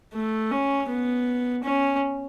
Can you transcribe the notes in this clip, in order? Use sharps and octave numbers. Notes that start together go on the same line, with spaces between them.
A3
C#4
B3
C#4